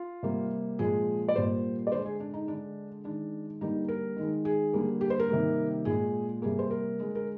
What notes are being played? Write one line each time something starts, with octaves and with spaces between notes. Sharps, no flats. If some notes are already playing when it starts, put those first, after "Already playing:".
Already playing: F4
C3 G3 A#3
A#2 F3 G#3 G#4
D5
A#2 G3 A#3 C5
D5
D3 G#3 C5
G#4
D4
D#4
D3 G#3 D4
D#3 G#3 D4
D3 G3 A#3 D#4
A#4
D#3 G#3
G#4
D3 G3 A#3
G4
C5
A#4
C3 D#3 G3 A#3
A#2 G#3 G#4
C3 G3 A#3 G#4
C5
A#4
D3 G#3
A#4